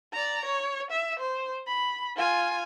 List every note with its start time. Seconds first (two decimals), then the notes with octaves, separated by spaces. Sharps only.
0.13 D5 A#5
0.45 C#5
0.91 E5
1.19 C5
1.67 B5
2.16 F4 G#5